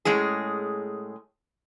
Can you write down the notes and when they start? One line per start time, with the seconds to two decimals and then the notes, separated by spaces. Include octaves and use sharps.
0.05 A2 G#3 C#4 G#4